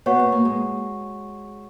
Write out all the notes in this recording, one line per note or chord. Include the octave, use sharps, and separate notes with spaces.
B3 F#4 C#5 F#5 C#6
A#3
A#3
G#3